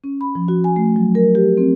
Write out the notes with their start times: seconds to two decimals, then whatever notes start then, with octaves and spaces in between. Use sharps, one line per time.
0.04 C#4
0.21 B5
0.35 F3
0.48 F#4
0.64 G#5
0.76 A3
0.96 F#3
1.15 A#4
1.35 G4
1.57 C4